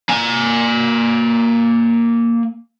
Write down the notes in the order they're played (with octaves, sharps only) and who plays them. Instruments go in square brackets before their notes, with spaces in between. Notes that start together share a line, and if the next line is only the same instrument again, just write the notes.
[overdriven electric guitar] A#3 G#5